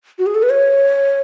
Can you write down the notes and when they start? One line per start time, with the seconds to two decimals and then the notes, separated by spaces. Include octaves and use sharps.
0.19 F#4
0.26 G#4
0.35 A4
0.43 B4
0.50 C#5